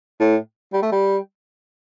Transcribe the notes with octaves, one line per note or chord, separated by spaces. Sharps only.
A2
G3
A3
G3